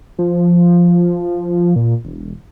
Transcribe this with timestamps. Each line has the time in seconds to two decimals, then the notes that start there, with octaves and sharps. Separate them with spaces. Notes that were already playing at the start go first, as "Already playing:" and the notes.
0.19 F3
1.76 A#2
2.05 E1